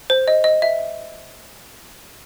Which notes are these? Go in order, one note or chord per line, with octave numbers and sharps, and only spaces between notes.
C5
D#5
D#5
E5